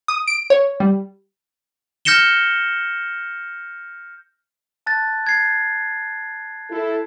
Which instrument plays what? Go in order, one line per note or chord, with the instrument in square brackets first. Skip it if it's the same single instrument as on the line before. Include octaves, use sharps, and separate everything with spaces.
[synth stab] D#6
D7
C#5
G3
[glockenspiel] F6 G6 A#6 C#7 E7 G7
A5 F#6 A6
G#6 C7
[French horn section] E4 A4